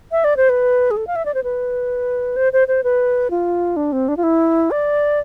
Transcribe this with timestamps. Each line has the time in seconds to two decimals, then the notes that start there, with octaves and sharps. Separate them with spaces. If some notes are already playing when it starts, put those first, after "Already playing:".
0.12 E5
0.24 D5
0.37 C5
0.49 B4
0.91 G#4
0.97 A4
1.07 F5
1.16 E5
1.26 D5
1.34 C5
1.44 B4
2.36 C5
2.53 C5
2.68 C5
2.84 B4
3.31 F4
3.77 D4
3.92 C4
4.08 D4
4.17 F4
4.23 E4
4.71 D5